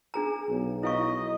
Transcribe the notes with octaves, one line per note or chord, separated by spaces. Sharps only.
D4 G#4 A#5
B1
E4 D#5 F5 C#6